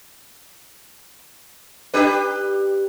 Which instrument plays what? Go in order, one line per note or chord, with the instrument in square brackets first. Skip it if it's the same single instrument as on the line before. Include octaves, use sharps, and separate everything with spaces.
[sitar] D4 G4 B4